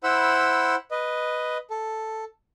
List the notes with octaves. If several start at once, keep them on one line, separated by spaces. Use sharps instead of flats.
E4 C5 F#5 B5 E6
B4 D#5
A4